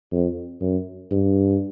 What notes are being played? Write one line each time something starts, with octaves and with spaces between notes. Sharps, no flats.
F2
F#2
G2